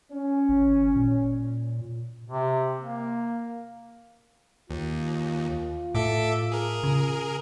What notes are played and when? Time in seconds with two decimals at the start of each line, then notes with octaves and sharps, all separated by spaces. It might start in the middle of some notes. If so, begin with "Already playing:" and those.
0.12 C#4
0.49 G#1
0.96 A#2
2.27 C3
2.80 A#3
4.70 D#2 F4
5.95 A2 A4 E5 D6
6.52 G#4 A#4
6.84 C#3